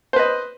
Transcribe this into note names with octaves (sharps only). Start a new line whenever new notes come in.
B4 C5 D#5